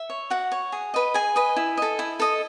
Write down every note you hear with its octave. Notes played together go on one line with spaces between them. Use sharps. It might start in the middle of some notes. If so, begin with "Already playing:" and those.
Already playing: E5
C#5
F#4 F#5
C#5
G#4
B4 D#5
G#4 G#5
B4 D#5
E4
A4 D#5
E4
A4 D#5